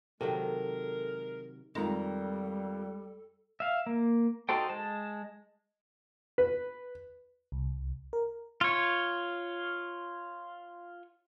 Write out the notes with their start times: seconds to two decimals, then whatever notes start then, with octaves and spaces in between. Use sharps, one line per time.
0.21 C3 D#3 F#3 G#3 A4 A#4
1.75 F2 D#3 G3 G#3 A4 A#5
3.60 E5 F5
3.86 A#3
4.49 D#4 F#4 A4 C5 G5
4.69 G#3 A5
6.38 B4
7.52 C2
8.13 A#4
8.61 F4 C#5